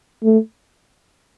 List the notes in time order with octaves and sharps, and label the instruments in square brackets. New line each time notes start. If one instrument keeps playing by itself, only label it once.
[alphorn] A3